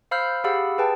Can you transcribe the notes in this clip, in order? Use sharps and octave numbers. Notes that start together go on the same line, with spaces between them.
C5 F5 B5 E6 F6 G6
G4 G#4 F5 F#5 B5 E6
G#4 B4 G5 A5